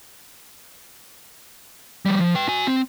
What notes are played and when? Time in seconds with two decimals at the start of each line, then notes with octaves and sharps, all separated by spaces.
2.06 F3 G3
2.20 F3
2.35 B4 G5
2.48 F#4 G#5
2.67 C4